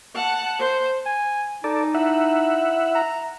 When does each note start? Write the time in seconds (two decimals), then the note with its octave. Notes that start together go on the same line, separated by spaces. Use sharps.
0.15 F#5 A5
0.59 C5
1.06 G#5
1.64 D#4 A4 D5
1.95 E4 E5 F#5
2.95 A#5